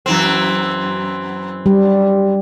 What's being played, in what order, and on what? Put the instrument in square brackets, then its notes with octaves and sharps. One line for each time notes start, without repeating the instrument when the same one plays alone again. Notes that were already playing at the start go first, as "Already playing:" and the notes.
[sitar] F#2 E3 C4
[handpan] G3